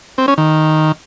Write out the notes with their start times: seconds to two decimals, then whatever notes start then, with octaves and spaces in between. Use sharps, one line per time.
0.18 C4
0.28 C#4
0.38 D#3